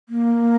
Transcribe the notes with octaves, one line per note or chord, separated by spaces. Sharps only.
A#3